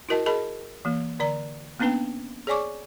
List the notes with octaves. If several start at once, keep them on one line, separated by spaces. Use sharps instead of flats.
E4 F#4 A#4 D#5 A5
G#4 A#4 D#5 A5 B5
E3 A#3
D3 D5 A#5
A#3 B3 C#4 D4 B4 G5
G#4 C#5 D5 G#5 C#6 D6